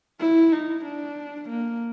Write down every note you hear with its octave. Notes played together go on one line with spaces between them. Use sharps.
E4
D#4
D4
A#3